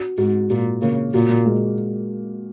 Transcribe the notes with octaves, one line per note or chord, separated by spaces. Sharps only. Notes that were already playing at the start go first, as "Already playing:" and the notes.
Already playing: F#4
G#2 F#4
A#2 F#4
C#3 A#3
A#2 F#4
G#3